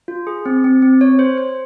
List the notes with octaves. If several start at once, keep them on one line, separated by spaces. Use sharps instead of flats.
F4
G#4
C4
C4
C4
C#5
C5
C5